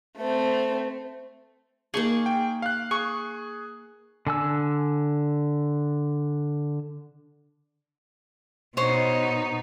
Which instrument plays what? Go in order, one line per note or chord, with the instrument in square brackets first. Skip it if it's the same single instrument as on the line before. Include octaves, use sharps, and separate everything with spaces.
[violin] A3 C4
[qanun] A#3 D#4 C6 [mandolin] G#4 C#6
[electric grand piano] G5
F5 F#6
[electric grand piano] G#4 [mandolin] C#6
[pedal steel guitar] D3 G#5 E6
[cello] B2 D#4 [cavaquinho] C5 C#5